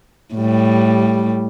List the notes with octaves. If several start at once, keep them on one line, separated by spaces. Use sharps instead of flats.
A2 G3